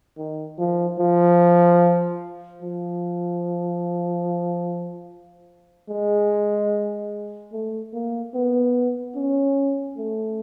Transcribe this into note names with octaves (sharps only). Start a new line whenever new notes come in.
D#3
F3
F3
F3
G#3
A3
A#3
B3
C#4
A3